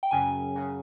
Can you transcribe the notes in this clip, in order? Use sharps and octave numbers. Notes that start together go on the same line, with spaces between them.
G5
F#2 C#3 F#3 G#5
C#3 F#3